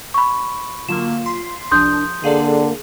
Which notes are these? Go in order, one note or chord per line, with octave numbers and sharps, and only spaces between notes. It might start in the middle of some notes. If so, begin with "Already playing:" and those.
B5 C#6
D3 F#3 A#3 F4 E7
C6 B6 C7
C2 F3 D4 C6 D#6 G6
D3 A#3 G#4 A4 D5